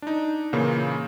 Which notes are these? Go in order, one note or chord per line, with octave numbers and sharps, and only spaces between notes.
D4 D#4
A#2 C#3 E3 A#3